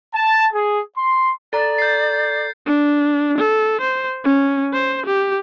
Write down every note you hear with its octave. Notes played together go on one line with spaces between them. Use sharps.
A5
G#4
C6
A4 D5 A#5 A6
G6 C7
D4
A4
C5
C#4
C5
G4